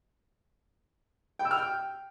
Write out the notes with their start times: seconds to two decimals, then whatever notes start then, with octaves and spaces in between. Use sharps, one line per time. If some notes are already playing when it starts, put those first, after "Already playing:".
1.39 G5
1.45 E6
1.51 F6
1.57 G5